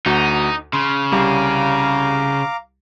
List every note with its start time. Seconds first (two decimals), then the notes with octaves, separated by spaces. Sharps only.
0.06 D2 D#4 F#4
0.73 C#3 C6
1.12 C2 G3 F5 A#5 D6